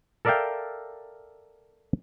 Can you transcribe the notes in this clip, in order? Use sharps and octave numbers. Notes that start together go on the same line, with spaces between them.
A4 A#4 D5 E5 F5 G5